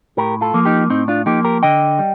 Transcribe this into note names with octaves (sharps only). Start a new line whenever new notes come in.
A2 G4 A#4
F4 A4
F3 A#3
D#4 G4
A2 C4 D#4
D4 F4
F3 A#3 D#4 G4
G4 A#4
D3 D#5 G5
G3